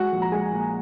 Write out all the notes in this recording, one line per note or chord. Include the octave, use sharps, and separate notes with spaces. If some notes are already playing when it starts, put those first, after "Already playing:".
Already playing: G#3 F#4 F#5
A#1
A#5
G#3 G#4 G#5
A#2